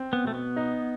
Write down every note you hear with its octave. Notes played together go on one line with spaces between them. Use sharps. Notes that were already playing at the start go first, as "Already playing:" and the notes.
Already playing: C4
B3
B2 A3
B3
D#4